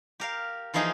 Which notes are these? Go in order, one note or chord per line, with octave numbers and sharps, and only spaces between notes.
G4 A#4 F5
E3 F3 A#3 D#4 G#4 A#5